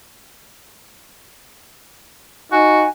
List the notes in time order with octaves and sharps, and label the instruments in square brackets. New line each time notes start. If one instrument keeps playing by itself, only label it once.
[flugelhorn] D#4 [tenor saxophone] F#4 [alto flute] G#5